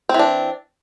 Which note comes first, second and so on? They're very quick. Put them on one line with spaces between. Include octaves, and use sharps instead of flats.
C4 E3 D4